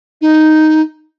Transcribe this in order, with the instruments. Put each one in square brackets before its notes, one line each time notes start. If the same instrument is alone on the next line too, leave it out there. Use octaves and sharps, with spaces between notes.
[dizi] D#4